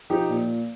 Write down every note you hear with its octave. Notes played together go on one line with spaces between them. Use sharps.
F3 D#4 G4
A#2